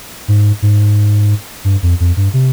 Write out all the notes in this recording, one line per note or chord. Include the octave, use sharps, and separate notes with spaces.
G#2
G#2
G2
F2
F2
G2
C3